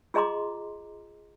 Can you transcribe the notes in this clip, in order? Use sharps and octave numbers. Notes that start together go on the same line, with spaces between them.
F4 G#4 D#5 A#5 C6 D6